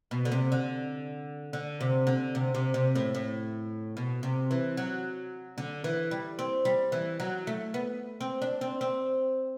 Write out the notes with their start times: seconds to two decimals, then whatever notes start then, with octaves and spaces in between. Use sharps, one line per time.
0.11 B2
0.25 D3
0.32 C3
0.52 D3
1.53 D3
1.81 C3
2.07 D3
2.35 C3
2.55 C3
2.74 C3
2.95 A2
3.15 A2
3.97 B2
4.23 C3
4.51 E3
4.77 F#3
5.58 D3
5.84 E3
6.11 G3
6.39 C4
6.65 G3
6.92 E3
7.20 F#3
7.47 A3
7.74 B3
8.21 C4
8.42 D4
8.61 C4
8.81 C4